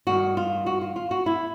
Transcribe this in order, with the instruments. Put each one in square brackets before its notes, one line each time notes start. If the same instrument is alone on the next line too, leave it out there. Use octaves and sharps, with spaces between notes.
[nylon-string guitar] G2 D#3 F#4
F4
F#4
F4
F4
F#4
E4